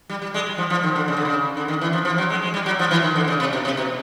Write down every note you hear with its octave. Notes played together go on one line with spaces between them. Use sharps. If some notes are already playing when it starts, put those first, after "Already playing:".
G3
G3
G#3
G3
F3
F3
D#3
D3
C#3
D3
C#3
D3
D#3
E3
F3
F3
F#3
G#3
G#3
G3
F#3
F3
E3
D#3
D3
C#3
C3
B2
C3
B2